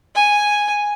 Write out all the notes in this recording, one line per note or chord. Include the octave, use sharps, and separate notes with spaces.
G#5